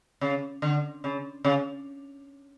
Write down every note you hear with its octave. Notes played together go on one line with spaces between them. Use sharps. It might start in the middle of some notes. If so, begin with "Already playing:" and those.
C#3
D3
C#3
C#3